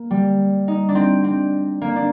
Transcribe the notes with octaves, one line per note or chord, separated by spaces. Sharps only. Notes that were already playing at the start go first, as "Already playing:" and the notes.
Already playing: A#3
G3
D#4
D4
C4
C4
A#3
D4